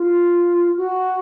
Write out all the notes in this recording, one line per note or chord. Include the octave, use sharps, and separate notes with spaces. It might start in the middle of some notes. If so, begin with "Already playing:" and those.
Already playing: F4
F#4